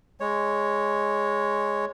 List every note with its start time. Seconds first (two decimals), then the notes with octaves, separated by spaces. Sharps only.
0.20 G#3 C#5